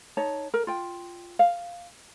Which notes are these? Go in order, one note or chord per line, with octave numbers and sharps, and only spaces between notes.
D#4 C#5 A5
A#4
F4 G5
F5